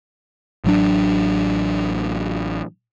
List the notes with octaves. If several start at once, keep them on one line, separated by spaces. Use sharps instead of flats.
A1 F#3 D4